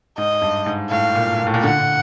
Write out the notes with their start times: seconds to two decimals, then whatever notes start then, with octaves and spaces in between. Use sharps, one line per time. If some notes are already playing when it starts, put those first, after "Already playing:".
0.18 G#2 D#5
0.42 G2
0.66 G#2
0.90 A2 F5
1.15 A#2
1.39 A#2
1.47 A2
1.54 A#2
1.64 D3 F#5